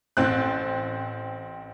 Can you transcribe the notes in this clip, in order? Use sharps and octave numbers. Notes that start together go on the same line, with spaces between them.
A1 C4 F#6